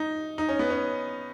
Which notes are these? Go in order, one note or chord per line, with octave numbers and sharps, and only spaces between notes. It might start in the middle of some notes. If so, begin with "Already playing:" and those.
Already playing: D#4
D#4
C#4
B3
C#4